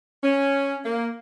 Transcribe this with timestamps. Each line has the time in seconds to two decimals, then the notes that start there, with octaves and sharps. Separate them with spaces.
0.23 C#4
0.84 A#3